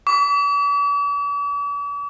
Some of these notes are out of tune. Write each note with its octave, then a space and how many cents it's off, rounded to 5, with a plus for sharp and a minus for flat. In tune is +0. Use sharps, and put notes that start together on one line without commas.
D6 -45